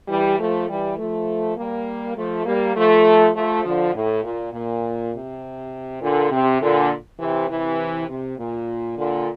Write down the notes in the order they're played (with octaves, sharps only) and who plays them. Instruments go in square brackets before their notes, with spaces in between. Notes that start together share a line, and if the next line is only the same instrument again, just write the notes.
[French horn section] E3 G3
F3 A3
E3 G3
F3 A3
G3 A#3
F3 A3
G3 A#3
F3 A3
F3 A3
D3 F3
A2
A#2
A#2
C3
A#2 D3
C3
A#2 D3
C3 E3
C3 E3
C3
A#2
A#2 D3